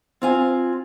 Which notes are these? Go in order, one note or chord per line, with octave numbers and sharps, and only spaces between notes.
C4 F4 G#5